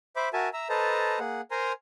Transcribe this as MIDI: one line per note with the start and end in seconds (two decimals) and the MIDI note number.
0.16 0.29 72
0.16 0.29 76
0.16 0.29 83
0.16 0.29 86
0.33 0.49 66
0.33 0.49 70
0.33 0.49 76
0.33 0.49 80
0.33 0.49 81
0.53 0.68 76
0.53 0.68 82
0.53 0.68 88
0.69 1.19 69
0.69 1.19 71
0.69 1.19 72
0.69 1.19 75
0.69 1.19 81
0.69 1.19 82
1.20 1.41 58
1.20 1.41 68
1.20 1.41 78
1.51 1.72 70
1.51 1.72 72
1.51 1.72 80
1.51 1.72 82
1.51 1.72 84